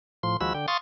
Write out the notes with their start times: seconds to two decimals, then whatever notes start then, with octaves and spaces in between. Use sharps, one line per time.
0.23 A2 F3 C6
0.41 D#2 F3 G#3 F#4 B5 E6
0.54 D3 G5
0.68 F5 C6 C#6 D#6 A6